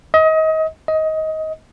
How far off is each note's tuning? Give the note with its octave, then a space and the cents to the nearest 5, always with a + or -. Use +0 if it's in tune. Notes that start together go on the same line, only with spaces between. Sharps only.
D#5 +30
D#5 +20